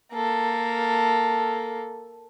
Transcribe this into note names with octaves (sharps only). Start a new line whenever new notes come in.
A#3 A4